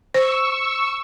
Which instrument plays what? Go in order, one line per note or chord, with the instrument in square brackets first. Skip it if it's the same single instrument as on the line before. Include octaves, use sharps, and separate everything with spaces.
[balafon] C5 [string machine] C#6 E6